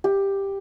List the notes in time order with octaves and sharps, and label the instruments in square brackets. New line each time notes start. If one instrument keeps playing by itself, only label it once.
[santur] G4